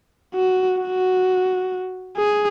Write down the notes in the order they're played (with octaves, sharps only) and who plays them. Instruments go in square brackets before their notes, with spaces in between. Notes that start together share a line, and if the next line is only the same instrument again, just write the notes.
[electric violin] F#4
F#4
G#4